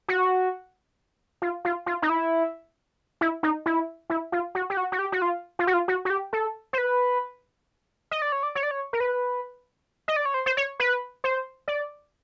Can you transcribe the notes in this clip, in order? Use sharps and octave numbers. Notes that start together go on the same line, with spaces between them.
F#4
F4
F4
F4
D#4
E4
E4
D#4
E4
E4
F4
F#4
G4
F#4
F#4
G4
F#4
F4
F4
F#4
F4
F#4
F#4
G4
A4
C5
B4
D#5
D5
C#5
D5
C#5
D5
C#5
A#4
B4
D#5
D5
C#5
C5
C5
C#5
B4
C5
D5